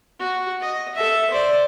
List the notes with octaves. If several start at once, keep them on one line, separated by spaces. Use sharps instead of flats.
F#4
D#5
A4 E5
C5 D5